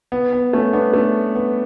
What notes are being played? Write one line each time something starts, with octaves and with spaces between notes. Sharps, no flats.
B3
B3
A3 C#4
B3 D4
A3 C#4
B3